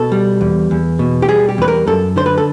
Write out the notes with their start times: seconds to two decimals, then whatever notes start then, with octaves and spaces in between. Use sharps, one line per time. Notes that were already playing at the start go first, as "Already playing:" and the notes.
Already playing: B2 A4
0.12 G3
0.41 E2
0.71 E2
0.99 B2
1.22 G4
1.28 G3 G#4
1.49 G4
1.58 E2 B4
1.68 A#4
1.87 F#2 A4
2.16 D3 C5
2.26 B4
2.38 A4